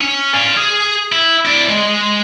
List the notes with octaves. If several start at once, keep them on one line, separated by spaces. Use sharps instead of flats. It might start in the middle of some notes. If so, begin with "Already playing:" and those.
C#4
D5 F5
G#4
E4
E4 D5
G#3